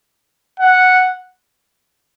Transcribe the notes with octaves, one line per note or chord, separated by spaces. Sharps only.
F#5